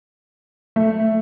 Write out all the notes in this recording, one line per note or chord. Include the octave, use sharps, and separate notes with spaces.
A3